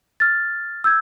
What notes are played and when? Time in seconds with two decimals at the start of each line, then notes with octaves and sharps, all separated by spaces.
0.20 F6 A6
0.84 E6 G6 G#6